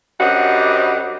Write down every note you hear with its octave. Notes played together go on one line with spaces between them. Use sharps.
F#2 G3 C4 D4 D#5 F#5